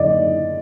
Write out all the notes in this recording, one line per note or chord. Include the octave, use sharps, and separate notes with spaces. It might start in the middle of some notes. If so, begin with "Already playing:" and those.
Already playing: F#1 F#2 D3 D5 D#5